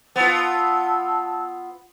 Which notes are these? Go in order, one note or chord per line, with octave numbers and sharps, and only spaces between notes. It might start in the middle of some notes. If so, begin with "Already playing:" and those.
B3 F4 A5 E6